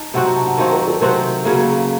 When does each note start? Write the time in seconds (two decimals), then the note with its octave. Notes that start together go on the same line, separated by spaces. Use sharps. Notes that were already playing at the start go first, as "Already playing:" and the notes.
Already playing: D#4 A5
0.14 C3 F#3 C4 F#4 F#5
0.25 A#5
0.36 A5
0.47 F#5
0.57 D#3 F#3 C4 F5
0.73 A#4
0.87 A4
1.01 C3 F#3 C4 F#4 A#4
1.45 C#3 F#3 A#3